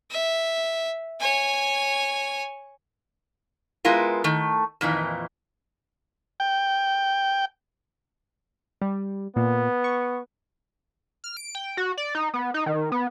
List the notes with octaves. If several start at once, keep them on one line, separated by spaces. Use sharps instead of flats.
E5
C#5 G#5
G#3 B3 E4 F4 A#4
D#3 A3
F2 A#2 D#3 E3
G5
G3
A#2 B3
C#6
F6
D7
G5
F#4
D5
D#4
B3
D#4
D#3
B3